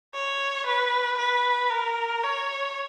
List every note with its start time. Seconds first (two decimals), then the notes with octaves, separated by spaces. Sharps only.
0.14 C#5
0.66 B4
1.18 B4
1.71 A#4
2.23 C#5